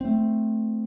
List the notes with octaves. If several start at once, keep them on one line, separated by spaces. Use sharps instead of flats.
A3 C4